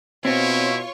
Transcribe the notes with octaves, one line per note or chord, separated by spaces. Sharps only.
B2 C4 E4 F4 C#5 C#6